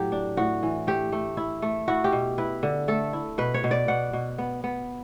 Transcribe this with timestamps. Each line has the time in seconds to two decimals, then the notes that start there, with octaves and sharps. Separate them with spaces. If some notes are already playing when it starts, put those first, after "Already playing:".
Already playing: A2 F#3 G4
0.12 D4
0.37 A2 F#4
0.63 E3
0.87 A3 G4
1.12 A3
1.37 E4
1.62 A3
1.88 E4 F#4
2.04 G4
2.12 B2
2.38 E4 B4
2.63 D3
2.88 A3 A4
3.13 E4
3.38 B2 B4
3.54 C#5
3.64 B2
3.71 D5
3.88 B2 F#5
4.13 B2
4.38 B3
4.64 B3